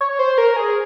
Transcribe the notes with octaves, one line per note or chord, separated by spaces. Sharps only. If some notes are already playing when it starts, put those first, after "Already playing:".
C#5
C5
A#4
G#4